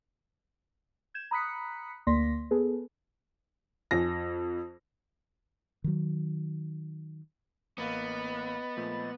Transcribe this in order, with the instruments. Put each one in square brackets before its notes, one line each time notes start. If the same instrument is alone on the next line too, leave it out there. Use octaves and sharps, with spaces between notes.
[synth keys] G6 G#6 E7
A#5 B5 D#6 F#6 B6 C#7
D2 A#3 D5 C6 A#6 B6
B3 G#4 A4 B4
[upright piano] F2 A#6
[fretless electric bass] D#3 F#3
[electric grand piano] A1 A#3 F5 [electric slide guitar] B3 [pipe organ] D#5 B5 A6
[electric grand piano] A#2 F3 A3